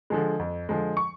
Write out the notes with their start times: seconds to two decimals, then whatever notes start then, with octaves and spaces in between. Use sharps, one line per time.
0.10 D3 F3 G#3
0.39 F2
0.69 D3 F3 G#3
0.97 C#6